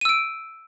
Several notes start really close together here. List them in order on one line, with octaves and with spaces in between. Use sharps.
D#7 E6 D7